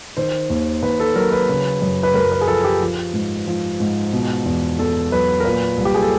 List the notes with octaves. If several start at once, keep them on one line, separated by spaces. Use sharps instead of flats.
D#3 C5
D#2
D#2 B4
A4
F#3 A#4
B4
C#3
F#2
B4
F#2 A#4
B4
G#4
F3 A4
G4
F3
G#2
F3
G#2
B2
E2
E2 A4
F#3 B4
A#4
A#2 B4
C2
G4
G#4
A4